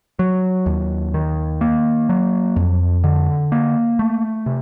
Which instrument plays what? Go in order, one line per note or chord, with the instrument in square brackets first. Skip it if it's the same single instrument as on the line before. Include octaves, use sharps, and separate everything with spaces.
[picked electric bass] F#3
D#2
D#3
A#3
F#3
F2
D3
A#3
A3
C3